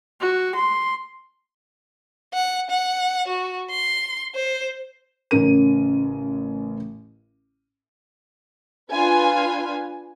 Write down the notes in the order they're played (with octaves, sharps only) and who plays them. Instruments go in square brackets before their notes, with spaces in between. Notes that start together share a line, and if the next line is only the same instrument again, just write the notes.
[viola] F#4
C6
[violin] F#5
F#5
F#4
C6
C5
[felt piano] A1 C#3 C#4 A#4 D#7
[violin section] D4 F4 B4 G#5